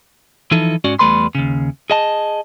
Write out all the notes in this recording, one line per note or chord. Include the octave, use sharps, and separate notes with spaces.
E3 F3 D#4 E4 A4
G#2 C#4 F#4 D5
E2 G3 A3 B4 B5 C6
D#2 C#3
G#4 D#5 A5